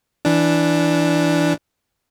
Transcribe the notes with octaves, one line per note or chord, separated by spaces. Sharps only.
E3 D4